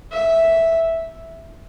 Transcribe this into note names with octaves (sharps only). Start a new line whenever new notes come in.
E5